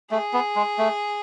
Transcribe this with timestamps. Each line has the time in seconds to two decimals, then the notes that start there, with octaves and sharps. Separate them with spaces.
0.11 A3 G#4
0.33 B3
0.56 G#3
0.78 A3